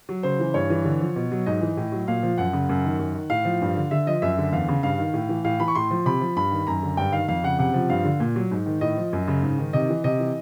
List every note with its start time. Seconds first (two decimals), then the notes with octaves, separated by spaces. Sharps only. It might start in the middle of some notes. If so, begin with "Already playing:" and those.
0.09 F#3
0.23 C#3 C5
0.40 E3
0.54 G2 C#5
0.70 E3
0.85 D3
1.00 F3
1.16 B2
1.32 F#3
1.46 G#2 D#5
1.61 E3
1.77 A2
1.92 F#3
2.08 A#2 F5
2.23 F3
2.38 F#2 F#5
2.53 C#3
2.69 F#2
2.84 D#3
2.99 F#2
3.15 D#3
3.30 A2 F5
3.45 F3
3.61 G2
3.76 D3
3.91 D3 E5
4.07 F3 D#5
4.22 F#2 E5
4.38 D3
4.52 E2 F5
4.68 C#3
4.83 G2 F5
4.98 D#3
5.14 A2
5.29 E3
5.45 A2 F5
5.60 E3 B5
5.68 C#6
5.75 A2 C6
5.91 F3
6.06 C3 B5
6.21 F3
6.37 G2 B5
6.51 D#3
6.67 F#2 A#5
6.83 D3
6.97 G2 G5
7.12 D#3 F5
7.28 F2 F5
7.43 C#3 F#5
7.59 C3 F#5
7.74 F3
7.90 G2 F5
8.05 D3
8.20 A#2
8.36 F#3
8.51 G#2
8.66 D#3
8.81 A2 D#5
8.97 F3
9.13 F#2
9.28 C#3
9.43 G#2
9.58 D#3
9.73 C3 D#5
9.89 E3
10.04 C3 D#5
10.19 E3